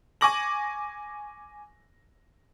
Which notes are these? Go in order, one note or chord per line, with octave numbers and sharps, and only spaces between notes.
G#5 C#6 D6 A#6 F#7